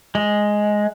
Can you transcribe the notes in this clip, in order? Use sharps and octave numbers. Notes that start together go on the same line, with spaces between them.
G#3